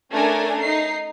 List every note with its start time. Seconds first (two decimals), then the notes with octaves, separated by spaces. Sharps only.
0.10 A3 C#4 D4 A#4 G#5
0.61 D#4 C7